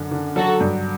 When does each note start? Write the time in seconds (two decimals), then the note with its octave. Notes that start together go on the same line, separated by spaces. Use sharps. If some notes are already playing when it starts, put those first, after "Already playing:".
Already playing: F#2 D3
0.11 D3
0.36 F#3 F#4 A4
0.60 G2